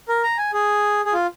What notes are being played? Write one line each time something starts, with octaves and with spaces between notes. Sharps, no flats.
A#4
A#5
G#5
G#4
G#4
F4